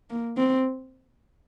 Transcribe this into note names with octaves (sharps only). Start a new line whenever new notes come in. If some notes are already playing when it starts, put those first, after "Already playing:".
A#3
C4